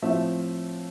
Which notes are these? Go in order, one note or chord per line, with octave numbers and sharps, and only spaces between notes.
A2 F3 A3 C4 E5